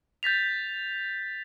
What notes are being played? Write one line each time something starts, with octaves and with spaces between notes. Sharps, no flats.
G6 A6 B6 F7